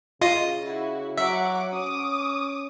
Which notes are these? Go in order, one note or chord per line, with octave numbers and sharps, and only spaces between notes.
C#3 F4 D#5 D#6
E4 F#4
F#3 E5 F#5 D6
C#4 D6 D#6